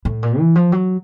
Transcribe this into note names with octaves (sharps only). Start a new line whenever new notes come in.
A2
A#2
E3
F3
F#3